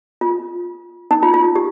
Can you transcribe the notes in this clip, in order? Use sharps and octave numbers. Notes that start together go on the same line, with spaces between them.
F4
D#4
F4
F4
F4
G4